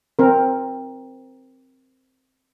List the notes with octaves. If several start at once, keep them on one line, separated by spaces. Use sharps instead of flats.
C4 A#4